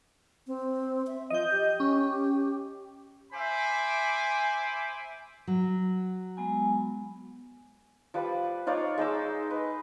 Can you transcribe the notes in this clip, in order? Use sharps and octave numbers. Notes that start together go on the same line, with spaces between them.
C4
E5
F3 D#5 G6
G4
C#4
C5 E5 G#5 B5 D6
F#3
G#3 B3 G#5
F3 G3 B4
D#4 F4 C#5 D5
G#3 D#4 D6 E6
B4